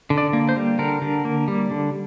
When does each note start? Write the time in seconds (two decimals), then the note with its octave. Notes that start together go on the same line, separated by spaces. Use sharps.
0.10 D3
0.18 D5
0.33 A#3
0.49 C5
0.56 G3
0.79 D3 A#4
1.02 D3
1.25 A#3
1.48 G3
1.71 D3